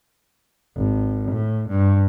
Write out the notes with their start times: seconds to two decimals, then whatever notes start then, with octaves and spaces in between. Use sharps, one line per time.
0.76 G#1
1.32 A2
1.69 G2